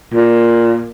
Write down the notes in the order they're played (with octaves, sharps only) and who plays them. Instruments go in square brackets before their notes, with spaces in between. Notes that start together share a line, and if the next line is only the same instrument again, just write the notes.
[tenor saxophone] A#2